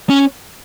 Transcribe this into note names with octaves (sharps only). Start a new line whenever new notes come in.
C#4